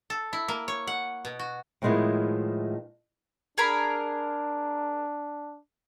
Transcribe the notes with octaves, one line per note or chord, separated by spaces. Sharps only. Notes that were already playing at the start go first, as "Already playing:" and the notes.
A4
E4
A#3
C#5
F#5
B2
F#4
A2 D#3 F3 G#3 B3 E4
D4 G#4 A#4 B5